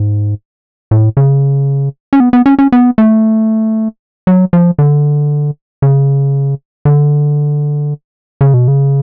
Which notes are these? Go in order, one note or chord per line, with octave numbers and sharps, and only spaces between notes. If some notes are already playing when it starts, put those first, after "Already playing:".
Already playing: G#2
A2
C#3
C#4
B3
B3
C#4
C#4
B3
A3
F#3
F3
D3
C#3
D3
C#3
B2
C#3